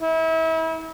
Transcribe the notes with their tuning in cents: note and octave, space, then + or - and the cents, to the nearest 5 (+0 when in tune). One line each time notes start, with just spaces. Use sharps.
E4 -35